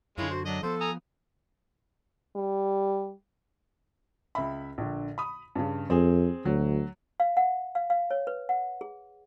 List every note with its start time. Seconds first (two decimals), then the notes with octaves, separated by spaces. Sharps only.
0.18 F#2 D3 G#3 C#4 E4 F4
0.31 F#4 C5
0.46 F#3 D4 D#5
0.63 F3 B3 A4 C5
0.81 G#5 A#5 D#6
2.36 G3
4.35 C#2 E5 B5
4.78 A#1 D3
5.18 B5 D#6
5.55 G2 C#3
5.90 F2 C4 G#4
6.45 D2 F#3
7.20 F5
7.37 F#5
7.75 F5
7.90 F5
8.11 C#5
8.27 B4
8.49 F#5
8.81 G#4